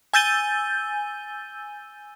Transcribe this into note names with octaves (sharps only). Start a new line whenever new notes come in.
G#5 E6 G6 A6 D#7 G7